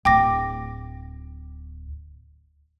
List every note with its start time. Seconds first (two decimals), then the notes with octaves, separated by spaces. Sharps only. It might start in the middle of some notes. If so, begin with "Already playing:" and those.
0.05 D1 G5 D6 A#6